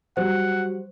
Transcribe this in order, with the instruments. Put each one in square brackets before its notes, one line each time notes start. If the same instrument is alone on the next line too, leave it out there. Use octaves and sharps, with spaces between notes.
[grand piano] F#3 G3 [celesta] C5 [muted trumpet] F#5